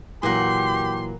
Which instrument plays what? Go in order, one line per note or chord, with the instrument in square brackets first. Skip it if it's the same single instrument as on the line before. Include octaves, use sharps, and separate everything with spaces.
[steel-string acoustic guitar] A#2 A#4 F#5 [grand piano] E3 F#3 [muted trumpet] G4 [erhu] C6